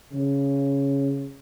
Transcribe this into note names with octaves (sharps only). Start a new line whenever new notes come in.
C#3